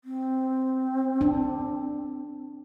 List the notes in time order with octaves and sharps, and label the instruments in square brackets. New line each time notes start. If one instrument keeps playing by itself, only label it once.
[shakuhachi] C4
[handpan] D4